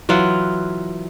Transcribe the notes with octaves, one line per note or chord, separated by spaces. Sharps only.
E3 F#3 F4 F#5